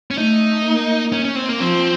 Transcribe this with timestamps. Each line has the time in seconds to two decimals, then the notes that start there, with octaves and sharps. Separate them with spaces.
0.11 C#4
0.17 A3 D#4
0.65 A#3
1.12 C#4
1.25 C#4
1.36 C4
1.49 A#3
1.60 F3 C4